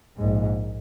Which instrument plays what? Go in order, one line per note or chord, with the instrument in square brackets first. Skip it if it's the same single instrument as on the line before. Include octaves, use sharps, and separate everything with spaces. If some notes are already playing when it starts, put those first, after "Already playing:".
[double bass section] A#1 G#2